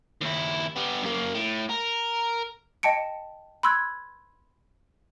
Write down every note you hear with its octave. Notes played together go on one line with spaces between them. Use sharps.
D#2 E4
G3 B3
F#2 A#3
A2
A#4
D#5 G5 A5 C#7 D7
B5 C6 E6 F#6 G#6